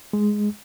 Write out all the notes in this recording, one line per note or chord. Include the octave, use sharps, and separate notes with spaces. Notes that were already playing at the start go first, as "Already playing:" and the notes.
G#3